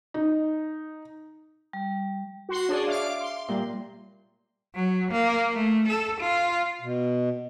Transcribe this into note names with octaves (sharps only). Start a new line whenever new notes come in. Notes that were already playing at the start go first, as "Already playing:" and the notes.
D#4
G3
F#4 C6
D4 G#4 C#5 D5
C#5 E5 F5 D6
C6
A#2 G3
F#3
A#3
A3
A4
F4
B2